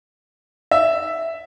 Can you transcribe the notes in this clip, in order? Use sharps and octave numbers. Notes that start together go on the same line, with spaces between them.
E5